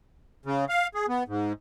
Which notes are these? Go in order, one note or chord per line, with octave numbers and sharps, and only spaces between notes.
C#3
F5
G#4
B3
G#2